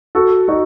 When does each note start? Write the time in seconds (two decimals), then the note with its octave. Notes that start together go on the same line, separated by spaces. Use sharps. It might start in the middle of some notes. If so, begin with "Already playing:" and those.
0.15 F#4 A4
0.48 D#4 F#4